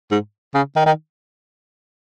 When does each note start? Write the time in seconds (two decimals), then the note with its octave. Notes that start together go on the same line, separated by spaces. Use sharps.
0.11 G#2
0.54 C#3
0.76 D#3
0.86 D#3